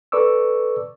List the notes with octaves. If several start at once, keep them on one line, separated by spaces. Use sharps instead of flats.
A4 B4 D5 C#6 D6 E6